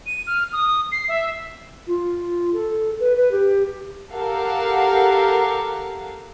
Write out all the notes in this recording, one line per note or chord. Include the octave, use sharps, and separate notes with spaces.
D#7
F6
D#6
C7
E5
F4
A4
B4
B4
G4
G4 A4 A#4 F5 F#5